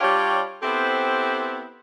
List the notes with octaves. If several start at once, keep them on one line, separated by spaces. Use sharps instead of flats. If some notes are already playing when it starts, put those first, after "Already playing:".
G3 D4 F4 G4 C#5
B3 C4 E4 G4 A4 C5